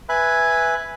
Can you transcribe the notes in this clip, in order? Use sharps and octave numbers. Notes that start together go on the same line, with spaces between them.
B4 E5 G#5 B5 F#6